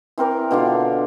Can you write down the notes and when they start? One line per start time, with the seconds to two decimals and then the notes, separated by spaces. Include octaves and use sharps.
0.18 E3 C4 A#4 D5
0.51 B2 D3 D4 F4